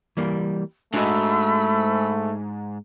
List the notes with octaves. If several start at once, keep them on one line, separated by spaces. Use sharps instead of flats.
E3 G3 A#3
G#2 A3 D4 F#4 D#5 B5 E6